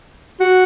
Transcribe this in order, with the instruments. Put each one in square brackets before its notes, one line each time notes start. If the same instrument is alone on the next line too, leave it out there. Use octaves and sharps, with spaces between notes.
[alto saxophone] F#4